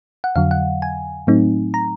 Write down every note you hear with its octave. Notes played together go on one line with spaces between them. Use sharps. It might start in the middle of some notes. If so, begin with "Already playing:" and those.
F#5
F2 D3 F#3 F5
F#5
G#5
A2 F#3 A3 C4 D#4
A#5